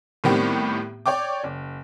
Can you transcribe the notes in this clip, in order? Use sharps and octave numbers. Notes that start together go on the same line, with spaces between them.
A2 D#3 G3 B3 C4 G4
C#5 D5 G5 D6
F#1